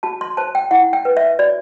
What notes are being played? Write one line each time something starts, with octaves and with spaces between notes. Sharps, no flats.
F#4 A5
C6
C5 A5
G5
E4 F#5
G5
B4
E5
F#4 D5